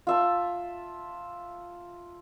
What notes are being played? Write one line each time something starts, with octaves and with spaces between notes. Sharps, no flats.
F4 E5 A5